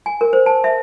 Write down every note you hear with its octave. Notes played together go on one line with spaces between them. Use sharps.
G#5
A#4
C5
A5
E5